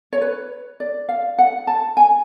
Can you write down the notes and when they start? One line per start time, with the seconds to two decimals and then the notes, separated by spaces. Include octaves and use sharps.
0.13 C#5
0.21 B4
0.80 D5
1.09 F5
1.38 F#5
1.67 A5
1.97 G#5